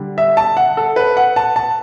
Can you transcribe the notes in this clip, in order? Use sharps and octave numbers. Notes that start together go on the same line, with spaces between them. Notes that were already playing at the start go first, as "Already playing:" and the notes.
Already playing: D3 G3 D4
E5
A5
F#5
A4
B4
F#5
A5
A5